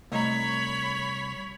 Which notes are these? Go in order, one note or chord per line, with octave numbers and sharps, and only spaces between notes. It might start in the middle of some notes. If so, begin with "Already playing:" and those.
C2 A3 C#5 D#5 A#5 B5